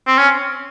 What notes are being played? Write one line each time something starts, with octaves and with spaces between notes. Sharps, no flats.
C4
C#4